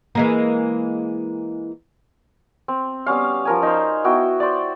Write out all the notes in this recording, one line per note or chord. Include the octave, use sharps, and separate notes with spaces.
E3 G#3 A#3
C4
G3 B3 C#4 F5
F3 A#4 G#5
D#4 C5
B3 E4 F#4 G5
C5 D5